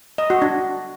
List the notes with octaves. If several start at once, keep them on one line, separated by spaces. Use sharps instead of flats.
D#5
F#4
D4